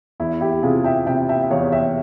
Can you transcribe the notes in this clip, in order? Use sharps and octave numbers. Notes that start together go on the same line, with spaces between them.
E2 E4
E4 G4
C3 F4 G#4
E5 G5
C3 E5 G5
E5 G5
E5
E2 C#5 F5
E5 G5